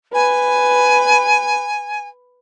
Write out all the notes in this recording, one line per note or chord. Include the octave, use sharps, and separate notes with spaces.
B4 G#5